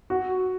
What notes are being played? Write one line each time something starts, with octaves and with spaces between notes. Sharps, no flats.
F#4